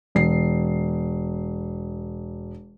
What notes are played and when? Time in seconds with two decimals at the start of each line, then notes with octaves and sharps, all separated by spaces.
0.15 E1 C7